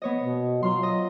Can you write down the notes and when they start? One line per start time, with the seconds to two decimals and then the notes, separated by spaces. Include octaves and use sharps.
0.02 B3 C#5 D#5
0.20 B2
0.63 F#3 F4 C6
0.83 D#5